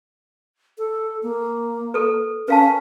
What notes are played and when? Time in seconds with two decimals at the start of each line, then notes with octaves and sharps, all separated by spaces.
0.78 A4
1.23 A#3
1.94 A4 B4
2.48 C#4 B4 F5 A5